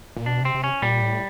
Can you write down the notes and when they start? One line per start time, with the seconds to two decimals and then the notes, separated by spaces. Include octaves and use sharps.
0.17 A#2
0.26 B2 D4
0.41 C3 C4
0.55 C3
0.64 C#4
0.82 A#2 G3
1.01 A2